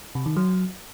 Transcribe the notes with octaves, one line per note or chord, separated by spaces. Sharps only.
C3
D#3
F#3